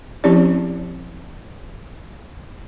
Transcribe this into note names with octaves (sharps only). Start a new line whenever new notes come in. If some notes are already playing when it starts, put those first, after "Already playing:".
F3 C4 C#4 E4 G4 D5